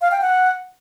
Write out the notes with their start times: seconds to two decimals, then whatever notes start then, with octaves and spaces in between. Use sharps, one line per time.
0.01 F5
0.11 G5
0.21 F#5